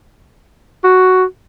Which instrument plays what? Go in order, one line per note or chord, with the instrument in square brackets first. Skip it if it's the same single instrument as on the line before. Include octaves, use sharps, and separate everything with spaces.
[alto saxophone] F#4